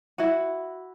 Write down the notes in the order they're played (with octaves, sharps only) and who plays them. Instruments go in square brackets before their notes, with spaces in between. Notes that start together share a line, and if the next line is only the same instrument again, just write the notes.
[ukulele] E4 F#4